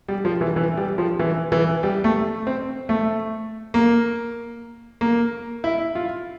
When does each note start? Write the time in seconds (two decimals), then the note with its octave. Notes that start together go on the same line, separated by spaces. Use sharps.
0.08 G3
0.25 F3
0.41 E3
0.56 E3
0.77 G3
0.98 F3
1.19 E3
1.52 E3
1.83 G3
2.04 A3
2.47 C4
2.89 A3
3.74 A#3
5.01 A#3
5.64 E4
5.95 F4